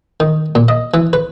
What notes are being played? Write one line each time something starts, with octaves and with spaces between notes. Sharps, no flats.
D#3
A#2
D#5
E3
B4